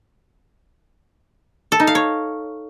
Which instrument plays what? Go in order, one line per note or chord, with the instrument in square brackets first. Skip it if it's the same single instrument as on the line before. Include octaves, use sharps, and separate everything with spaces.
[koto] A4
D#4
F5
C#5